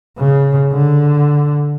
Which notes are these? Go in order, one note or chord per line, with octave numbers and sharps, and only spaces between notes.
C#3
D3